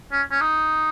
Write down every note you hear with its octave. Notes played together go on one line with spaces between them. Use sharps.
C#4
C#4
D#4